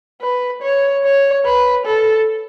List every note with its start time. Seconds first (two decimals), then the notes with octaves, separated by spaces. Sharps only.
0.21 B4
0.62 C#5
1.04 C#5
1.45 B4
1.86 A4